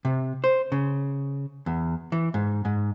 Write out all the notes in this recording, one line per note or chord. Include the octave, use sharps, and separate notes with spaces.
C3
C5
C#3
E2
E3
G#2
G#2